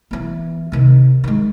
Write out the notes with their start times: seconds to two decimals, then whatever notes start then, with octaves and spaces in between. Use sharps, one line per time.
0.11 E3 B3
0.72 C3 D#3
1.24 D#3 G#3